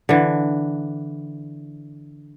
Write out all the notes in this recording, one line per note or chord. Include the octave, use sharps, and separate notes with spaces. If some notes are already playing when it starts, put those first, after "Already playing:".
D3 E3